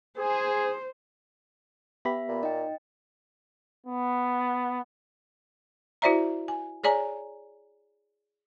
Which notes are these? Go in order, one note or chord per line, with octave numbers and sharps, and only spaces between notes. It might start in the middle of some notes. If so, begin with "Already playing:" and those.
G#4 C5
B3 G4 E5 B5
A#2
D#4 D#5 G5
B3
E4 F#4 C5 D5 E5 A#5
G#5
G#4 C#5 D5 G#5 A#5